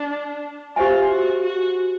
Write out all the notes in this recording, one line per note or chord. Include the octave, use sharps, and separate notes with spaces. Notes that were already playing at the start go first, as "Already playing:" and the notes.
Already playing: D4
F4 G4 C5 E5 G#5
F#4
F#4